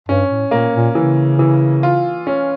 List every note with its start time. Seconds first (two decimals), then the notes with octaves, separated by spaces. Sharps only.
0.09 G2 C#4
0.30 A2
0.51 A#2 A#3
0.73 A#2
0.95 C#3 E3
1.39 E3
1.83 F4
2.27 C#4